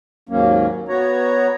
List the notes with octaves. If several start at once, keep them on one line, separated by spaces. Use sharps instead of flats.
D#2 G#2 F#3 A#3 C#4
B3 F#4 C#5 A#5